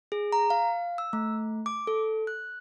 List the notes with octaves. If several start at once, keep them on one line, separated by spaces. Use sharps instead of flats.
G#4
A#5
F5
E6
A3
D6
A4
F#6